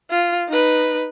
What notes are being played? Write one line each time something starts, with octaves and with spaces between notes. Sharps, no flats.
F4
D#4 B4